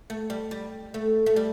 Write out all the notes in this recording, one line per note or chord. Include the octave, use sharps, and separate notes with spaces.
A3
G3
G3
A3
A3
G3